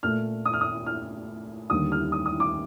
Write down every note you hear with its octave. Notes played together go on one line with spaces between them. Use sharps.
A#2 A3 F6
D#6
F6
D#6
F6
D#2 D3 G3 D#6
F6
D#6
D#6
D6